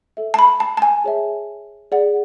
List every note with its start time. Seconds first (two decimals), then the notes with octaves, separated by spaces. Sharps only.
0.17 A4 E5
0.34 A5
0.39 B5
0.60 A5
0.77 A5
0.82 G#5
1.04 G#4 C#5 E5
1.92 G#4 D5 F#5